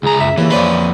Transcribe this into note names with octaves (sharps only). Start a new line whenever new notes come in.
C#2 G#4 A#5
F#2 E5
D#2 C#3 E3 A#3
F2 A#3 C#4 B4 C5 D5